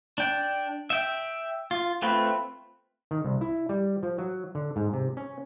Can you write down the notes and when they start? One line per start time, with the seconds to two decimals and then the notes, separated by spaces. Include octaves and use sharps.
0.18 D4 G5
0.90 E5 G5
1.71 F4
2.02 A3 C4 F4 B4
3.11 D#3
3.24 C2
3.41 E4
3.69 G3
4.03 F3
4.18 F#3
4.55 D3
4.76 G#2
4.93 C3
5.17 C#4